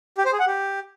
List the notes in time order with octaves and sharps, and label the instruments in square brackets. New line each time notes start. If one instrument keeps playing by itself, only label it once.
[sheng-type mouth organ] G4
C5
G#4
F#5
G4